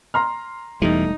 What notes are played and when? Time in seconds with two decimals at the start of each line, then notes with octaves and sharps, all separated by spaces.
0.14 A#5 C6 F6
0.82 E1 E2 E3 G3 A3 D#4